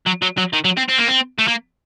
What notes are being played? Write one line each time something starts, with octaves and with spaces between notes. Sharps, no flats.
F#3
F#3
F#3
D#3
F#3
C4
C4
A#3
C4
A3
A#3